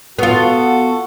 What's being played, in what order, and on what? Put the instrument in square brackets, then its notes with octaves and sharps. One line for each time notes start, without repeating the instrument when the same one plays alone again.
[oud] B3 F4 [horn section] F#4 A4